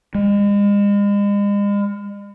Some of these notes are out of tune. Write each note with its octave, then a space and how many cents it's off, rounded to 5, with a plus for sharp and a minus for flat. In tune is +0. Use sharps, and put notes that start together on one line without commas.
G#3 -40